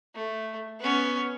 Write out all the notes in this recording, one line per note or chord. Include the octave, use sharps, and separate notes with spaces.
A3
B3 C#4